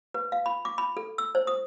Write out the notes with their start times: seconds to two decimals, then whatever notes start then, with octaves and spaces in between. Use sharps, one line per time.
0.14 B4
0.32 F5
0.46 B5
0.65 D6
0.78 B5
0.97 A4
1.18 E6
1.35 C5
1.47 D#6